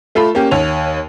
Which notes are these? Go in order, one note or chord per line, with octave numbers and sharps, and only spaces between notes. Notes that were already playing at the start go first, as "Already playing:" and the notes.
A3 F4 A4 B5
A#3 C#4 G4
D#2 C#5 F7